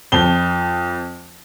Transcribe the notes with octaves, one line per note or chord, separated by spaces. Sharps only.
F2 G7